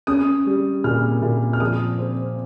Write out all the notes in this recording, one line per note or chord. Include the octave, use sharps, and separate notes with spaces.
C#4 D#6
G3
A#2 F6
A#2
F6
F3 D#6
C4